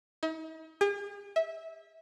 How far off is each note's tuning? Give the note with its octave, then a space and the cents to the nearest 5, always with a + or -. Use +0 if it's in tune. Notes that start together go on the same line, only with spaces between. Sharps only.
D#4 +45
G#4 -45
E5 -20